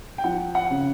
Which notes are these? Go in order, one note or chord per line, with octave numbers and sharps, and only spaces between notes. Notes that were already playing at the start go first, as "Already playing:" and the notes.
G5
F3 F#5
F#5
C#3